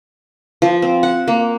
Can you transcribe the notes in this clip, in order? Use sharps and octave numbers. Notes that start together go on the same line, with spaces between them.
F3
C4
F#5
A#3